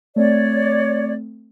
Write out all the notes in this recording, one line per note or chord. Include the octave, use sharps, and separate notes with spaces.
A3 C4 C#5 D5